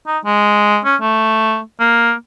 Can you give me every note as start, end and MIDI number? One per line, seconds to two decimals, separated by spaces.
0.07 0.18 63
0.25 0.79 56
0.85 0.96 61
1.01 1.60 57
1.80 2.14 58